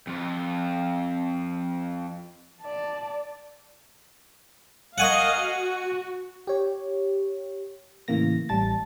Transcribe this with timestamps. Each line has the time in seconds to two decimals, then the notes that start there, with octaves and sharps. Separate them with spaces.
0.07 F2 F4
2.62 D5 A5
4.98 A#4 D#5 F5 F#5 G#5 C#6
5.41 F#4
6.47 G4 C#5
8.08 A2 C#3 E3 A#3 A#6
8.49 A1 G3 A5 A6